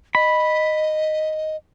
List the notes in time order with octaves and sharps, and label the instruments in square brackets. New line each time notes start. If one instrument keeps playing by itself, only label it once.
[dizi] D#5 [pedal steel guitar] B5